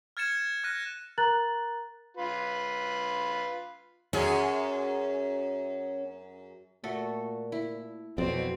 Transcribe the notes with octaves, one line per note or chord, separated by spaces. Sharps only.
F6 G#6 A6 C#7 E7
F6 F#6 A#6 D#7
A#4 A#5 F#6 A6 F#7
F4 B4
F#2 C#4 G#4
A#2 A3 F#4 A4
E4
F2 B2 F#3 C4 D5